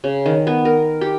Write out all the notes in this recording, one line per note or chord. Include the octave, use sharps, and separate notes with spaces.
C#3
D#3
B3
A#4
G4